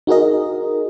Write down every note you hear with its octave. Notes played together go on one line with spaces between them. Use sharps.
D#4 F#4 G#4 A#4 D#5